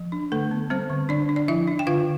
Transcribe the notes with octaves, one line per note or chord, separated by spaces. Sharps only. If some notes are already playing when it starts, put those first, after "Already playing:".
Already playing: F3
D4
D3 A3 A4
B3
G3 C4 C5
D3
D3 D4 D5
D4
D5
F3 E4 E5
D4
G5
D3 F4 F5